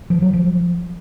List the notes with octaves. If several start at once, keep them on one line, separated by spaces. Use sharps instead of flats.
F3
F#3
F3